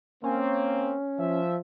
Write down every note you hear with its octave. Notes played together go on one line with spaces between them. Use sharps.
A#3 C4 C#4
F3 E5